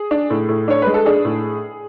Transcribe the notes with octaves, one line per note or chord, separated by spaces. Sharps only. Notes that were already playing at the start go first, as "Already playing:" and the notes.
Already playing: G#4
D4
A2
A2
D4 C#5
G#3 B4
A4
D4 G#4
A2